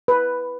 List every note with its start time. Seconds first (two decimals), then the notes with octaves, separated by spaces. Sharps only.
0.08 B4